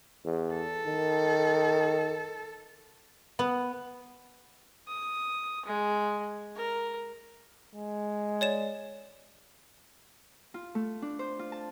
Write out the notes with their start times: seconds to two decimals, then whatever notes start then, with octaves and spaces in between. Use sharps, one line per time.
0.25 E2
0.54 A4
0.86 D#3
3.39 B3
4.88 D#6
5.66 G#3
6.56 A#4
7.75 G#3
8.41 C#5 D5 E7
10.54 F4
10.75 A3
11.02 D4
11.19 C5
11.39 F4
11.52 A5